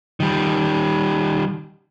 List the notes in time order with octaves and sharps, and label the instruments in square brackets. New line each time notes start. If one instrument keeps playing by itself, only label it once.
[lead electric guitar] D#3 G3